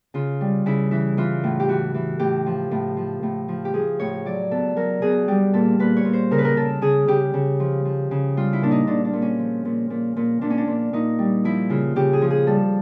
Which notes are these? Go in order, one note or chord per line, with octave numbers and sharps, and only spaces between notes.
C#3 F4
G3
C#3 E4
E3 E4
E3 F4
A2
G4
E3 F#4
E3
A2 G4
F3
A2
F3
A2
F3
G4
F3 G#4
A2 C#5
F#3 D5
B2 A4
F#3 A#4
B2 G#4
G3 G4
A#2 A4
A#2 B4
C#5
A#2
C5
C#3 A#4
B4
A#4
C#3 A4
C#3 G#4
C#3 G4
C#3
F3
F3
C#3
G3 F4
E4
A#2 D4
D#4
A#2 D4
D4
A#2
C#4
F3
A#2
A#2
A#2
A#2 D4
C#4
D4
A#2
A#2 D#4
G3
F3 E4
C#3 F4
C#3 G4
G#4
F3
G#4
G3 A4